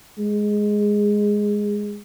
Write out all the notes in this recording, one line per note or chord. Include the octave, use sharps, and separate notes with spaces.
G#3